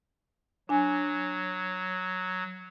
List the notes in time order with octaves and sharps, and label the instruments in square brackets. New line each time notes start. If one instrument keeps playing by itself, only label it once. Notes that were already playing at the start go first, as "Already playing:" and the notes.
[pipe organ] F#3 [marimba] D4 G#5